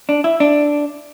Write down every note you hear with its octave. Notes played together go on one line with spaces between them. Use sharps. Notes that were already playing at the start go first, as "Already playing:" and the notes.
D4
E4
D4